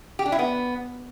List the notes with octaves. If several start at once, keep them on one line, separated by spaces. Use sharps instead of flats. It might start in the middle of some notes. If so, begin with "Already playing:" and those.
G4
D4
E4
B3